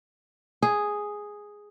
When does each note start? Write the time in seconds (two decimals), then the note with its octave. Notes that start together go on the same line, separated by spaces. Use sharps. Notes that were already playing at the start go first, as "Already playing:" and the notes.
0.63 G#4